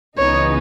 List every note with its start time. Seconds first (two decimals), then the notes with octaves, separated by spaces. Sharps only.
0.18 C#2 C#3 E3 B3 D#4 C#5